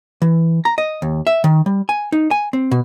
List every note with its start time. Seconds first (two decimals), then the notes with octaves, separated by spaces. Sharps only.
0.22 E3
0.65 A#5
0.78 D#5
1.02 D#2
1.27 E5
1.44 D#3
1.66 G3
1.89 G#5
2.12 D#4
2.31 G#5
2.53 C4
2.71 B2